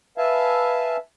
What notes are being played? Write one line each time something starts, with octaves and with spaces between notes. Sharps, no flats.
B4 E5 F5 G#5 A5